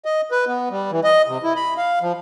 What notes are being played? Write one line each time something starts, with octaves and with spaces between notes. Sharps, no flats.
D#5
B4
B3
G3
E3
D#5
C3
E4
B5
F5
F3